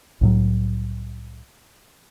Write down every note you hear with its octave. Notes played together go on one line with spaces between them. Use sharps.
C2 A2 F#3